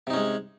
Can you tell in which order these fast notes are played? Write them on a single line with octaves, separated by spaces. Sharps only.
C3 D#4 C#4 G#3